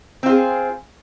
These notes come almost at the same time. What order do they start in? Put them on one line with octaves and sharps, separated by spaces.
C4 F4 G#4